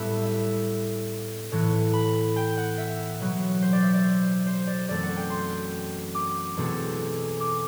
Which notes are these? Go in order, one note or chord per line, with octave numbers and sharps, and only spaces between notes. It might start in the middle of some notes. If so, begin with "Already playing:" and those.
Already playing: A2 G3 B3 E5
E5
A2 E3 B3
B5
G5
F#5
E5
B2 F#3 B3
C5
D5
E5
D5
C5
C5
D5
F#2 E3 A3 C4 D5
F#5
G5
C6
D6
E2 B2 A3 C4
D6